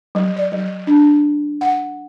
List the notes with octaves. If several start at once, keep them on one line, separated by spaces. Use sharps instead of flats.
F#3
D5
F#3
D4
F#5